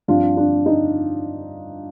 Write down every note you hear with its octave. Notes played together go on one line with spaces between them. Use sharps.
G2 F3 C4 D4 F4
D4
D#4